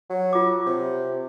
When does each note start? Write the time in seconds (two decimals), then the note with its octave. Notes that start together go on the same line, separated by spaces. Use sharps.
0.10 F#3
0.33 F4 D6
0.66 C3